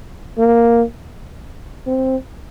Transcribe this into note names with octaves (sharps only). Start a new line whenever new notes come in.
A#3
C4